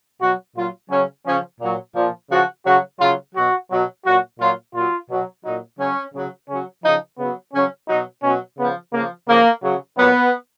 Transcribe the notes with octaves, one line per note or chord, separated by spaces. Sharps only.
B2 F#3 F#4
A#2 F#3 F4
C#3 F#3 C#4
C#3 F3 C#4
A#2 F#3
A#2 F3
C#3 F3 F#4
C#3 F#3 F#4
C#3 F#3 F4
B2 F#3 F#4
B2 F#3
A#2 F#3 F#4
A#2 F#3 F4
A#2 F#3 F4
B2 F#3
A#2 F#3 D#4
C#3 F#3 C#4
C#3 F#3
C#3 F#3 C#4
C#3 F3 D#4
C#3 F#3 B3
C#3 F#3 C#4
B2 F#3 D#4
B2 F#3 C#4
C#3 F3 B3
C#3 F3 A#3
C#3 F3 A#3
C#3 F#3
A#2 F#3 B3